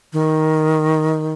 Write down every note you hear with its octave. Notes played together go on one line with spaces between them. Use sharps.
D#3